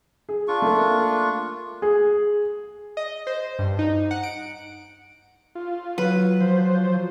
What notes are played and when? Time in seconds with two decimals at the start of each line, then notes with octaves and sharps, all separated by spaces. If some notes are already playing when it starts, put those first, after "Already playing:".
0.29 G#4
0.48 D4 F4 C#6
0.62 A3 A#3
1.82 G#4
2.97 D#5
3.27 C5
3.59 G2
3.79 D#4
4.11 F#5
4.23 D7
5.55 F4
5.98 F#3 B4
6.41 F3 C5